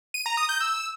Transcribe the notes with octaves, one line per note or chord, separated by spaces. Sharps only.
D#7
A#5
D#6
G6
E6